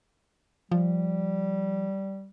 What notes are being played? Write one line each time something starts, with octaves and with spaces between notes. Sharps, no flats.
F3 G3